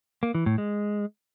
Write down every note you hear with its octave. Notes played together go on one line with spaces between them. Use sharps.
A#3
E3
A2
G#3